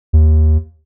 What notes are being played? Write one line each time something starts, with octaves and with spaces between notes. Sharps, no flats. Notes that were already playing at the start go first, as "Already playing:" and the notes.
D#2